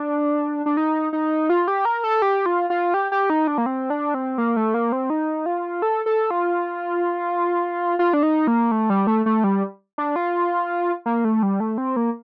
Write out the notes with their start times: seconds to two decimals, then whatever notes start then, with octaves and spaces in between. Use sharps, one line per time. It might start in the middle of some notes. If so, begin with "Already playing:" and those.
Already playing: D4
0.66 D4
0.77 D#4
1.13 D#4
1.49 F4
1.68 G4
1.85 A#4
2.04 A4
2.22 G4
2.46 F4
2.70 F4
2.94 G4
3.12 G4
3.30 D#4
3.47 D4
3.58 A#3
3.66 C4
3.90 D4
4.14 C4
4.38 A#3
4.56 A3
4.74 A#3
4.92 C4
5.10 D#4
5.46 F4
5.82 A4
6.06 A4
6.31 F4
7.99 F4
8.13 D4
8.23 D#4
8.47 A#3
8.71 A3
8.90 G3
9.07 A3
9.26 A3
9.44 G3
9.98 D4
10.16 F4
11.06 A#3
11.25 A3
11.43 G3
11.60 A3
11.78 C4
11.96 A#3